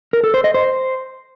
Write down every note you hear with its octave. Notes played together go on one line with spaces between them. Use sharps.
A#4
A4
C5
D#5
C5